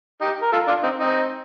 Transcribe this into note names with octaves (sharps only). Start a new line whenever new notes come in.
D#4 G4
A#4
F4 A4
D4 F4
C4 D#4
C4 D#4